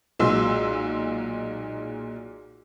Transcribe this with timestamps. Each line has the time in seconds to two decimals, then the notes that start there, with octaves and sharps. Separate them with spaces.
0.19 B1 A#2 G#3 C6 E6